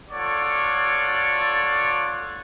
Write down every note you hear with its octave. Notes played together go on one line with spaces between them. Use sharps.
F4 A4 C#5 D5 F#5